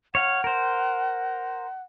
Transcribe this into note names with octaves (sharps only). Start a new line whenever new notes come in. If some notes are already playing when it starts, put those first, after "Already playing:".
C#5 F5 F#5
A#4 C5